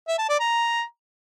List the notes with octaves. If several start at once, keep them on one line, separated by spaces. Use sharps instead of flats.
E5
A5
D5
A#5